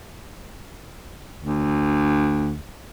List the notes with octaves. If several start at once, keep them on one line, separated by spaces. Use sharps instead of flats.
D2